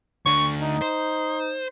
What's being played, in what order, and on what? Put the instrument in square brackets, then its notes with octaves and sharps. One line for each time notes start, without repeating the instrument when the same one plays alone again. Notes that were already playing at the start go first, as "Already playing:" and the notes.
[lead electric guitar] D2 D3 [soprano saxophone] C#6
[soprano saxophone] D#4
[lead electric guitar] C5